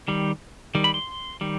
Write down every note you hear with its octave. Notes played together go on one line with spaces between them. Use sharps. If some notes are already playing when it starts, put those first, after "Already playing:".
D#3 G3
D#3 G3
B5
C6
D#3 G3